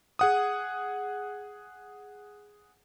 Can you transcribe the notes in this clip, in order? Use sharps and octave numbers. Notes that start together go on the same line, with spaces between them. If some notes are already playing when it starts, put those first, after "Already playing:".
G#4 F#5 D#6